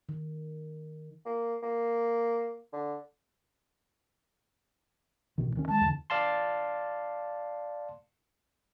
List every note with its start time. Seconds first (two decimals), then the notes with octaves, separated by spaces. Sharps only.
0.09 D#3
1.26 A#3
1.63 A#3
2.73 D3
5.38 A1 B2 D#3
5.55 D2 D#3 C#4
5.68 D#3 G#3 A5
5.81 E2 D3
6.10 D5 F5 A5 C6